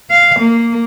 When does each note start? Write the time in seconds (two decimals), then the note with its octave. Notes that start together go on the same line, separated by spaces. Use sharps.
0.11 F5
0.41 A#3